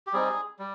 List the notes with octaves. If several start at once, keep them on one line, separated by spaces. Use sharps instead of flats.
G4
G3 C4 D#4 G#4
G3